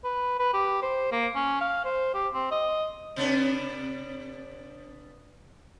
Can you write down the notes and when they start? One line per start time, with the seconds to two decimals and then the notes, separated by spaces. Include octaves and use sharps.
0.04 B4
0.40 B4
0.54 G4
0.82 C5
1.12 A#3
1.36 C#4
1.61 F5
1.85 C5
2.14 G4
2.34 C4
2.51 D#5
3.16 C3 B3 D4